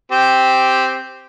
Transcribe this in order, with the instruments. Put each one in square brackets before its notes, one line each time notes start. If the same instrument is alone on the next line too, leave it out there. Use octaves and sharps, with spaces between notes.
[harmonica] C4 G4